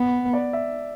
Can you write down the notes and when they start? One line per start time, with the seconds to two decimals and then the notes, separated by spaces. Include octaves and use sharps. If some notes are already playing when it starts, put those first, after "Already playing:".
Already playing: B3
0.33 D5
0.53 E5